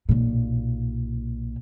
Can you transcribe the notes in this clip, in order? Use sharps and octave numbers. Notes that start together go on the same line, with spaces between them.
B1 A#2